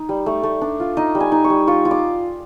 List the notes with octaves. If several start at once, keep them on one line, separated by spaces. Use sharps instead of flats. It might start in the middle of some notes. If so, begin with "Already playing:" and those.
Already playing: D#4
G3
A3
A3
D4
F4
D#4 D#5
G3
G#5
D#4
C#6
G3
F4 C#6
F4
D6